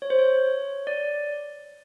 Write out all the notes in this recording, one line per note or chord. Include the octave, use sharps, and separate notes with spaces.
C#5
C5
C#5
D5